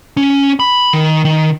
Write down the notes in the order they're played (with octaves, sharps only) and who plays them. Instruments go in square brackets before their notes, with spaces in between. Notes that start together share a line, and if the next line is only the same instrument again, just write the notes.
[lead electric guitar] C#4
B5
D#3
D#3